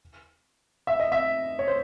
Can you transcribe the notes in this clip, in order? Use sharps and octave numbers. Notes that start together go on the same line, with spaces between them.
E5
D#5
E5
C#5
C5